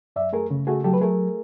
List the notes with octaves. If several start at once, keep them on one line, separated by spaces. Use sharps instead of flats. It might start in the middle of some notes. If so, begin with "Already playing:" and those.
F#2 D5 E5
A3 G#4 A#4
C#3
A3 F#4 G#4
F#3 G4 A4
B4
A3 G#4 A#4